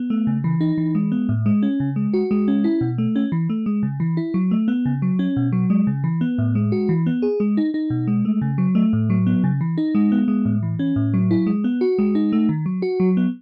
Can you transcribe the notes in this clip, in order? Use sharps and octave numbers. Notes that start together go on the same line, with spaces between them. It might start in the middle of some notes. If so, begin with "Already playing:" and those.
Already playing: B3
A3
C#3
E3
D#4
E3
G#3
B3
A2
G#3
C#4
C#3
G#3
F#4
G#3
C#4
E4
B2
A3
C#4
E3
A3
G#3
C#3
E3
E4
F#3
A3
B3
C#3
F#3
C#4
B2
F#3
G#3
C#3
E3
B3
A2
G#3
F#4
E3
B3
G#4
G#3
D#4
D#4
B2
G#3
A3
C#3
F#3
A3
A2
F#3
B3
C#3
E3
D#4
G#3
B3
G#3
A2
E3
C#4
A2
F#3
E4
G#3
B3
F#4
G#3
D#4
A3
D#3
F#3
F#4
F#3
B3